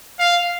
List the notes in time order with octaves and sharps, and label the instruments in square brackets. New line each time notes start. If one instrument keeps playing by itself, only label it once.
[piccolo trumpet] F5